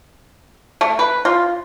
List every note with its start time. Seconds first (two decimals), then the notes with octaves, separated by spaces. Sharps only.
0.81 A3
0.99 B4
1.25 F4